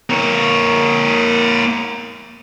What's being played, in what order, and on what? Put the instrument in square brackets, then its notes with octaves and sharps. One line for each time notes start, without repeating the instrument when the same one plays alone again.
[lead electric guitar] A#3 C#5